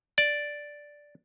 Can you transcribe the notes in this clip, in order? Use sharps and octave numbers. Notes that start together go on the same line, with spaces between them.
D5